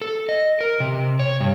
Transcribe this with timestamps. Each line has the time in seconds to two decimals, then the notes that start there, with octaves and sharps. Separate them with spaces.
0.02 A4
0.29 D#5
0.61 A#4
0.80 C3
1.19 C#5
1.40 G2